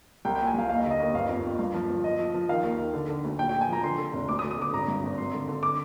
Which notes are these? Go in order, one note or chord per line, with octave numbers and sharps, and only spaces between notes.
C2 G5
G5
A#2
G#5
C2 F5
D#2 F5
D#5
D3
D#5
D#2
G1 F5
F2
F2
G2
F3
G1
F3 D#5
F3
F3
D#3 F5
D#2
D#3
D3
D3
D2
A#1 G5
G5
A#1
G#5
F3 A#5
D3 C6
D3
F1
D2 D6
D#6
D2
D#6
D3 D6
G#1 A#5
G2
G#1
G#1 C6
D3
D3
D6